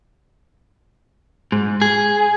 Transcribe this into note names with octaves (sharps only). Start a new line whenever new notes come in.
G#2
G#4